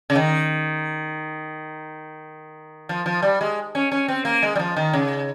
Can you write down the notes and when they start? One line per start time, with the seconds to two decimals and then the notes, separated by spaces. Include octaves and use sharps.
0.10 C#3
0.16 D#3
2.89 F3
3.06 F3
3.22 G3
3.41 G#3
3.75 C#4
3.92 C#4
4.08 C4
4.25 A#3
4.43 G#3
4.56 G3
4.59 F3
4.76 D#3
4.93 C#3